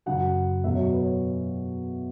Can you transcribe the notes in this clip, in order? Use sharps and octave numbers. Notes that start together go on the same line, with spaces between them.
F#2 C#3 F#3 F#5
E2 B2 F#3 E5
C#5
B4
C#5